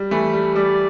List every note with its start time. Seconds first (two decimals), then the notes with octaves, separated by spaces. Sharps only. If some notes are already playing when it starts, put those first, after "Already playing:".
Already playing: G3
0.11 E3 A3 B4
0.33 G3
0.55 G3 D5